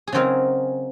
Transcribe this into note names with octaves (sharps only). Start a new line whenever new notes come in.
G#4
C#3 F#3 C4 D#4 A#4